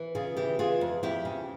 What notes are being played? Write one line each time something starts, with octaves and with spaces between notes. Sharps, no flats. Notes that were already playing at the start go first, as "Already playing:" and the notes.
Already playing: E3
C#3 F4 G#4
E3 E4 G4
E3 F4 G#4
F2
F2 E4 G4
C#3